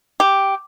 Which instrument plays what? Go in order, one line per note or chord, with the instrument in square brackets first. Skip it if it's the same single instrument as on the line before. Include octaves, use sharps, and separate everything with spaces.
[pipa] G4